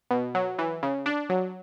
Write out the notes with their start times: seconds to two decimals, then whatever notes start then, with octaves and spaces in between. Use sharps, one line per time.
0.11 B2
0.35 F#3
0.59 E3
0.83 C#3
1.06 D4
1.30 F#3